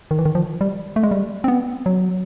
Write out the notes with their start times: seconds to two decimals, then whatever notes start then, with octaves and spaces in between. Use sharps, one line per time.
0.11 D#3
0.19 E3
0.25 D#3
0.35 F3
0.61 G3
0.96 A3
1.03 G#3
1.11 G3
1.44 C4
1.48 B3
1.86 F#3